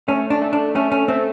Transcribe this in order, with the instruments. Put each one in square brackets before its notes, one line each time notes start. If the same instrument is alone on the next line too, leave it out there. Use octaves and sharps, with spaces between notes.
[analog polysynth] A3 [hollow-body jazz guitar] C#4
[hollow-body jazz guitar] D4
[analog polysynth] A3
[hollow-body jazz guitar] D4
[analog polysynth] A3 [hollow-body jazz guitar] C#4
[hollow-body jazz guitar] C#4
[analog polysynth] A3 [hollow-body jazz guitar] C4